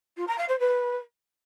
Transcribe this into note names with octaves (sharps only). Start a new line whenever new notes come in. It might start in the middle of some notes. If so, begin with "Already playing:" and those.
F4
A#5
F5
C5
B4